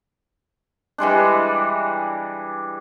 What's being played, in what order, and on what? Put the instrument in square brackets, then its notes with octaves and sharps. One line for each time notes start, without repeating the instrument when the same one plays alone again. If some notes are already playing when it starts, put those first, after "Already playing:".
[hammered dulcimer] E3 G3 G#3 D4